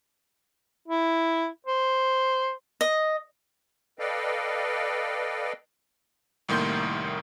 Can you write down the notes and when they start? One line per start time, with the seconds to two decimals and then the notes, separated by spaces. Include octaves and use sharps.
0.88 E4
1.66 C5
2.81 D#5
3.99 A4 B4 D5 D#5 F5 G5
6.49 C2 A2 D#3 A#3 C6 G6